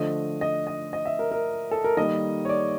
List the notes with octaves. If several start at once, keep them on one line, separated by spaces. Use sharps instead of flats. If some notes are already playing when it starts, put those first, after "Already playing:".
Already playing: D3 F3 A3 D#5
D#5
D#5
D#5
E5
A#4
A#4
A4
A#4
D#3 G3 A#3 D#5
C#5
D5